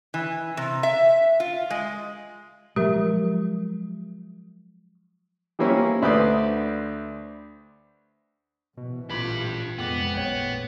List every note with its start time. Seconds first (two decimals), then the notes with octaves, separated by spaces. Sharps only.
0.14 E3
0.57 C3
0.83 E5
1.40 F4
1.70 G#3
2.76 F3 F#3 G#3 G4 A#4 E5
5.59 E3 G3 A#3 C#4 E4 C5
6.02 D2 B4 C5 D5 D#6
8.77 A#1 B2 E3
9.10 A1 D4 F4 B5 D6 B6
9.78 C2 F2 G#3 B3 G5 D6 A#6
10.14 A1 F#2 A#2 C#5 G5